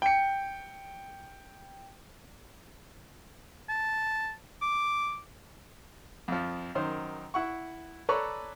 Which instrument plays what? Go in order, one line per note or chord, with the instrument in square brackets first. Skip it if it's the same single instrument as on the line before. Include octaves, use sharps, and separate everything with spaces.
[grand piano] G5 C#7
[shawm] A5
D6
[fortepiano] F2 F3
F#2 D#3 C5
E4 F#5 C#6
A4 B4 C#5 D5 A#5 C#6